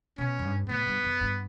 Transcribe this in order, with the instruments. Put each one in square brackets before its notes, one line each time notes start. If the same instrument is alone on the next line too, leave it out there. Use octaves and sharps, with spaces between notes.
[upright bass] B2 [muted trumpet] C#4
[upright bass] F#2
G2
[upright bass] A2 [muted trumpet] B3
[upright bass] G2
F#2
G2